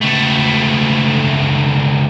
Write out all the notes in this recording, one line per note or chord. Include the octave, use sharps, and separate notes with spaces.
C#2 A3